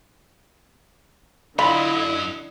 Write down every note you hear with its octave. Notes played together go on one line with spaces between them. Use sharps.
F#2 D3 F#3 E4 F4 D#5 B5